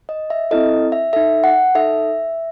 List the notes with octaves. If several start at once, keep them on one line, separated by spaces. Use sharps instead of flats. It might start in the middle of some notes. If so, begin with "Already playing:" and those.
D#5
E5
C4 E4 A4 D#5
E5
D#4 A4 E5
F#5
D#4 A4 E5